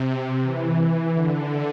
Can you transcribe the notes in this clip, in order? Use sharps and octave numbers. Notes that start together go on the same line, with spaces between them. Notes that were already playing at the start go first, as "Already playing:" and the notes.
Already playing: C3
E3
D3